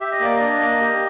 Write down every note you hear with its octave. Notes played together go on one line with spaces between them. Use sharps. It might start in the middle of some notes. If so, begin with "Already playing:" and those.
G4 E5
D#5
A#3 D5
D4 D#5
A#3
G4